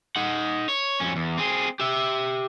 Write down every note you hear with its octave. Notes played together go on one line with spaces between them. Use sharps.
D#4 F#5
C#5
F2 C#4
E2
C4 G#4
G4 E5